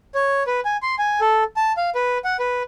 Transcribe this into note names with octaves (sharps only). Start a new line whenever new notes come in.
C#5
B4
G#5
C6
G#5
A4
A5
F5
B4
F#5
B4